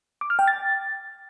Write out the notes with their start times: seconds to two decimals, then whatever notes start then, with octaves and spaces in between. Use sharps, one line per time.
0.21 D6
0.30 F6
0.39 G5
0.48 A6